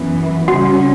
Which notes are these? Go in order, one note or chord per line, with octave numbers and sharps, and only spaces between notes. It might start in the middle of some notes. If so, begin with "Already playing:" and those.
Already playing: F#2 E3 B3
C#3 G3 C#4 F#4 F#5